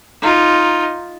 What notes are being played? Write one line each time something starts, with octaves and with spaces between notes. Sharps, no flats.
D#4 F4